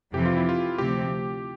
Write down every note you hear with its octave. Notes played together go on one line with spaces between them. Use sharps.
F2 C3 E3 G4
F4
E4
F4
D2 C3 F3 A3 C4 G4